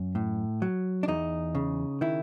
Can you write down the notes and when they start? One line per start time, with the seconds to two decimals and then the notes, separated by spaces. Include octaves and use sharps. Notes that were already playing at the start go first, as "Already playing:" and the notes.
Already playing: F#2
0.15 A2
0.62 F#3
1.03 D4
1.08 E2 D#4
1.55 C#3
2.01 D#3 E4